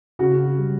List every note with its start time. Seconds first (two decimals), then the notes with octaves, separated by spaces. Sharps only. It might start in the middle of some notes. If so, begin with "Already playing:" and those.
0.19 C#3 F#4
0.57 G3